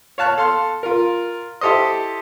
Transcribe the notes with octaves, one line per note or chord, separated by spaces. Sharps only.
C#5 F5 A5 F#6
A4 F5 C6
F4 A#4
E4 G4 A4 C5 D#5